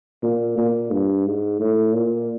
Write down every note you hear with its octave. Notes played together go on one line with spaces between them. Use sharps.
A#2
A#2
G2
G#2
A2
A#2